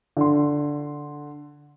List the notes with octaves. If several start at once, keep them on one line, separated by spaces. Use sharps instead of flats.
D3 C6